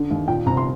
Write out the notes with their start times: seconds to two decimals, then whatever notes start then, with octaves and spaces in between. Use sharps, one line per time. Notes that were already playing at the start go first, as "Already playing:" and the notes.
Already playing: D3
0.11 D#2
0.28 A#2 G5
0.46 C2 A#5
0.57 C6